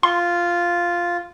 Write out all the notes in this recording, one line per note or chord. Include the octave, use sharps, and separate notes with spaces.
F4 C6